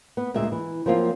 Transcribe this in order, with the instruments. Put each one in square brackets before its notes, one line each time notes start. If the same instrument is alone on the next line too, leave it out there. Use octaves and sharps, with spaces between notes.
[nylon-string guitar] B3
D2 A#2 G#3 E5
E3
F3 F#3 A#3 C4 F4